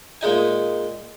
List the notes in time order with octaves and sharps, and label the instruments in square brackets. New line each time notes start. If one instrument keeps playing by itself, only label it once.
[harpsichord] A#2 G#3 D#4 G#5